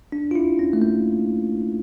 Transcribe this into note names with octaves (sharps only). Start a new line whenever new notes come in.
D4
F4
E4
C#4
A3
A#3